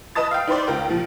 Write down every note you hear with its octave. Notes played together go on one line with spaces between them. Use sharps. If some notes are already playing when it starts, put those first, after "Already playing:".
B4 D#5 A5 D#6 A6
F5 G5
D#4 B4 C5 D5
C#2 A#4 G5
A#2 F3